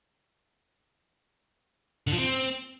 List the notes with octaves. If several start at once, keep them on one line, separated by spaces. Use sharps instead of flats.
D3
F3
C4